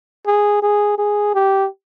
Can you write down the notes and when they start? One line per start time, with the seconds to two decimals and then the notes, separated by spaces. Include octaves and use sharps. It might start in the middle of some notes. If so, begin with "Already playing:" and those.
0.26 G#4
0.62 G#4
0.98 G#4
1.34 G4